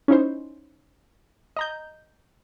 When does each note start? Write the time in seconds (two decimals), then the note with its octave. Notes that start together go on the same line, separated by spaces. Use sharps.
0.08 C#4 D#4 E4 C5
1.57 D#5 A#5 G6